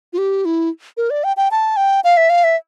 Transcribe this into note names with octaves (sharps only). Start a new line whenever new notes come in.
F4
G4
E4
A#4
D5
G5
G5
A5
G5
F5
E5
F5
E5